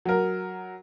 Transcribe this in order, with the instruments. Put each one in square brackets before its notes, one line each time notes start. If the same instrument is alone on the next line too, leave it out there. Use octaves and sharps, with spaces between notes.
[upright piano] F#3 A#4